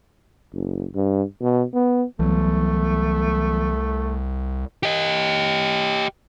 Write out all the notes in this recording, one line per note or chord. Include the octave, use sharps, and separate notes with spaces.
F#1
G2
B2
B3
C2 E3 F#3 A3 B3
G4 D#5